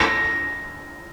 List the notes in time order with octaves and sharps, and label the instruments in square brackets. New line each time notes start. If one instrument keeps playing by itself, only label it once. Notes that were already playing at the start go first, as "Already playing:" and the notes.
Already playing: [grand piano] A#6